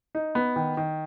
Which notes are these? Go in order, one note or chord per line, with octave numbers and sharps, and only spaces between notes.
D#4
B3
D#3
D#3